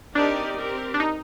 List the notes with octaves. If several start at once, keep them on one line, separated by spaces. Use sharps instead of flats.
C4 D4 D#4 G4 A#4 D5
C4 G4 A#4
D4
D#4